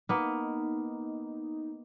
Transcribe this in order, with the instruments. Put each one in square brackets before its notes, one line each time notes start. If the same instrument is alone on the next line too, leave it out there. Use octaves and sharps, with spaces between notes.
[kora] A#3 B3 [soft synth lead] D#4